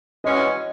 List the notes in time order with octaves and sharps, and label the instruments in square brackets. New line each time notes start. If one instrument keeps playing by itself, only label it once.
[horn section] E3 G#3 C#4 F#4 [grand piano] D#5